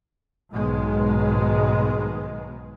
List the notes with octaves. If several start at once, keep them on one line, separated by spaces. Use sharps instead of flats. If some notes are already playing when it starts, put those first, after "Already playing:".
B1 G#2 B2 D#3 G#3